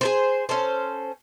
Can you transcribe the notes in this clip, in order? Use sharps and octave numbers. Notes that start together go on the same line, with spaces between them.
G#4 B4 C5
C#4 A4 C5